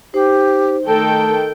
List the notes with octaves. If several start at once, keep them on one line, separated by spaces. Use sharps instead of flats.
D#4 G4 C5
D#3 A3 A4 A#4 G5 A5